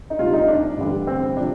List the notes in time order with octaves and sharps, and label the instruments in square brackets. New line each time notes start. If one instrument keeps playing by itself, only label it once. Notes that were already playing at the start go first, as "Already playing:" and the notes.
[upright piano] D#4
D2 C3 G3 F4
D#4
D4
A1 G2 D3 G3
C4
C3 F3 D4